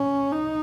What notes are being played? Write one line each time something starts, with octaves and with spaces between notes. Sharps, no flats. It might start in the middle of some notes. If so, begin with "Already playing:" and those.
Already playing: C#4
D#4